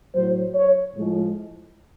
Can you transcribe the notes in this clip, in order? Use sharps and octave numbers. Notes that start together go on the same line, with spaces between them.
A2 F#3 C5
C#5
A2 F3 G#3